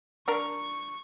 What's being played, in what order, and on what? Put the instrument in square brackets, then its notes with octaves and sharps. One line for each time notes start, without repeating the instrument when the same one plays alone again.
[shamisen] D4 A#4 [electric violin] C#6